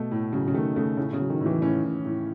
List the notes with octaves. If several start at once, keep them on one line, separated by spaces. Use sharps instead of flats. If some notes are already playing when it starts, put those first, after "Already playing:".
Already playing: B2 A3
A2
C#3 F#3
C#3
D#3 A3
C#3 A3
A2 C#3
C#3
F#3
D#3
A2
E3
A2 C#4
A2
A2